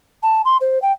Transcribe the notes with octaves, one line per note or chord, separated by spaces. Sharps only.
A5
C6
C5
G5